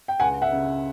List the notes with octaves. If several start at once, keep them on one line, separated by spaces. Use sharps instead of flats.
G5
C#2 F#5 G#5
E5 F#5
C#3